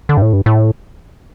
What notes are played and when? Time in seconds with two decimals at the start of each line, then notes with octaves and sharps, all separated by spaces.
0.09 D3
0.17 G2
0.22 A2
0.33 G2
0.46 A2